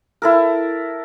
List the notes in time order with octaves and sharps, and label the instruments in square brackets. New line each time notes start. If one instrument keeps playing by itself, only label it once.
[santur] E4 A4 A#4